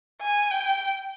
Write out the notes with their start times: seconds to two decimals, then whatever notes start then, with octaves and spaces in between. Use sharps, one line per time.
0.21 G#5
0.51 G5